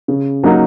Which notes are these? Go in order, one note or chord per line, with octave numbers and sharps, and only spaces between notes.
C#3
F#3 A#3 D#4 F#4